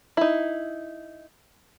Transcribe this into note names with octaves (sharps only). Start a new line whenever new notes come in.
D#4 E4